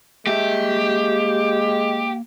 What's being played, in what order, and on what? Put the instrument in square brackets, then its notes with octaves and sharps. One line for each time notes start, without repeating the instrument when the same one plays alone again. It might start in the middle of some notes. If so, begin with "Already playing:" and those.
[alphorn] G#3 [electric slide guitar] A#3 E5 [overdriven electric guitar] G4